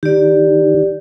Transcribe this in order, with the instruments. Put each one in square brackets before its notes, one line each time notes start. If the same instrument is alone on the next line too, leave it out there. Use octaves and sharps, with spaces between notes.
[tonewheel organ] D#3 [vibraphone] G4 D5